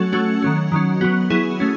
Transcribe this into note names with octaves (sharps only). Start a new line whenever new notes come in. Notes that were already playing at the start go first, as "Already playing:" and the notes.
Already playing: F#3 A3 C#4 F#4 A4
F#3 A3 C#4 F#4
D#3 F#3 C#4
D#3 F#3 C#4
F#3 B3 F#4
F#3 B3 E4 G#4
A3 C#4